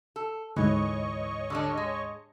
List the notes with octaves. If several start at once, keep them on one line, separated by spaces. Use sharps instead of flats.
A4
D2 G#2 E3 C#5 D#5 C#6
D3 G3 D4
G#3